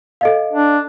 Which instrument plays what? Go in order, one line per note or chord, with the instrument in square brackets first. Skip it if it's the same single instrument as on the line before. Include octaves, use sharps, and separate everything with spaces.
[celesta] A4 D#5 F5
[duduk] D4